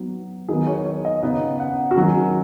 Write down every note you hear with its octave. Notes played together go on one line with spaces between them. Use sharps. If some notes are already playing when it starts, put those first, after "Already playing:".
Already playing: F#3 B3 D#4 F#4
D#3 F#3 B3 G#4
C#5
C#5
D#5
C#3 B3 D#4 D#5
F#5
F#4
D#3 F#3 C#4 G#4